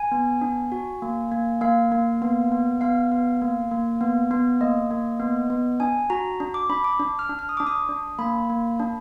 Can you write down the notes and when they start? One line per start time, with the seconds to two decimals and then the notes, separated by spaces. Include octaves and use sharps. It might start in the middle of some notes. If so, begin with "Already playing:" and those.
Already playing: G#5
0.12 B3
0.41 D4
0.72 F#4
1.02 A#3
1.32 A#3
1.61 A#3 F5
1.92 A#3
2.22 B3
2.52 B3
2.81 B3 F5
3.12 B3
3.42 A#3
3.71 A#3
4.01 B3
4.31 B3
4.61 A#3 D#5
4.91 A#3
5.20 B3
5.50 B3
5.80 D4 G#5
6.10 F#4 A#5
6.40 D4
6.54 D6
6.70 D4 B5
6.84 D6
7.00 D4
7.19 F6
7.29 D4
7.39 F6
7.49 D#6
7.57 D4 D6
7.67 D#6
7.89 D4
8.19 A#3 B5
8.50 A#3
8.79 D4